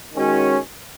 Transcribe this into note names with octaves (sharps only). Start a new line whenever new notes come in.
D#3 G#3 C#4 F#4